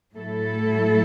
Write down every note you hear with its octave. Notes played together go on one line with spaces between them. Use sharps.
A2 F#3 A3 E4 A4